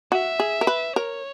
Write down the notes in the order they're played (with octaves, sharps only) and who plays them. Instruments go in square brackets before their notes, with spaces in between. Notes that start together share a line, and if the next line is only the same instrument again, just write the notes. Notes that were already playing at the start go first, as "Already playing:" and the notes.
[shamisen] F#4 [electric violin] E5
[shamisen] G#4
A#4
B4
[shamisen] A#4 [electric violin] C#5